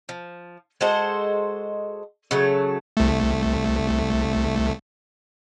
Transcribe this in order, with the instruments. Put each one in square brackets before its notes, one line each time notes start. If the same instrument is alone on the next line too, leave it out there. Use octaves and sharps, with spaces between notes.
[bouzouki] F3
G#3 F#4 A4 C5
C#3 F#3 A3
[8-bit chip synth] C2 A3